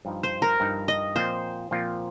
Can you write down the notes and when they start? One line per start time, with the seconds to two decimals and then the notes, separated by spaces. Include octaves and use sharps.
0.05 G2 F3 D#4
0.23 C5
0.42 A#4
0.60 G2 F3 D#4
0.88 D#5
1.15 A#2 F3 C4 F4 C5
1.71 A#2 F3 C4 F4